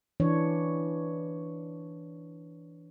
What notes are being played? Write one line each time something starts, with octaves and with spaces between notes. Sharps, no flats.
E3 D4 C#5